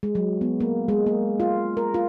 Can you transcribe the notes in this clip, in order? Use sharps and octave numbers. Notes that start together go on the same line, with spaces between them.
G#3
F#3
B3
A#3
G#3
A#3
F4
A#4
F4